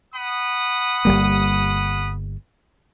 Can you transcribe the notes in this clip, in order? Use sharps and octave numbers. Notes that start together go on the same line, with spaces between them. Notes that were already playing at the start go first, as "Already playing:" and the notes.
F#5 B5 D#6
G1 G3 A#3